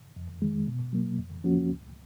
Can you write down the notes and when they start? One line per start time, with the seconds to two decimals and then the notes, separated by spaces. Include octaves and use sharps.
0.16 F2
0.42 D#3 G#3
0.68 B2
0.93 F#3 A#3
1.18 F2
1.44 F3 A#3 C#4 F#4
1.69 C#2